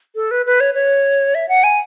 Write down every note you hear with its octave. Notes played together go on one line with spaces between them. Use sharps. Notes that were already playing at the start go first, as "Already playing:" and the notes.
A4
B4
B4
C#5
C#5
E5
F#5
G#5